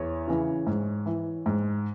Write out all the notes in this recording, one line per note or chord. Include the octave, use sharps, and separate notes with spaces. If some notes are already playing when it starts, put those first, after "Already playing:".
Already playing: E2 C#5
C#3 E3
G#2
E3
G#2